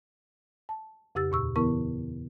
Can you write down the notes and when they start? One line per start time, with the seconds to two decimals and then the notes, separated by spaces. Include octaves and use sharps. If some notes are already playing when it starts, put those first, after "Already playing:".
0.69 A5
1.15 F2 C#3 G4 E6 A6
1.31 D#2 A#2 C#6 E6
1.56 C#3 E3 B3 E4 A#4 C#6